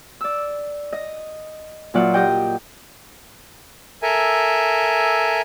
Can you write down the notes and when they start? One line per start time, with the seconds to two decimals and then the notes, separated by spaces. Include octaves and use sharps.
0.21 D5 E6
0.93 D#5
1.94 A#2 F#3 F4 D5 E5 F#5
2.14 G4 D#5 G5
4.02 A4 A#4 E5 G#5